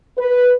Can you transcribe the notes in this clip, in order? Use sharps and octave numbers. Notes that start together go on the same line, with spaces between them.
B4